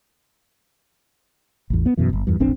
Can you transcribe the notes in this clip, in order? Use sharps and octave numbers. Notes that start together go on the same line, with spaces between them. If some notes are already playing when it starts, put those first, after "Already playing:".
A1 E2
B3
F#2 B2 E3
D1 G1
E2 G2
E1 A1 C4 D4